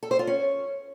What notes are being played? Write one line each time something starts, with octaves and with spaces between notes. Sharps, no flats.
A4
C5
F4
C#4